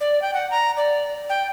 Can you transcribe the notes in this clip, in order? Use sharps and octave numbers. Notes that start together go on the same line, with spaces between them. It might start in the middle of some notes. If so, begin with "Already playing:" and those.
D5
G5
F#5
A#5
D5
G5